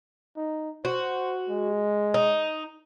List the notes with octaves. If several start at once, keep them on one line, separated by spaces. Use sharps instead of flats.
D#4
F#4 C5
G#3
D#4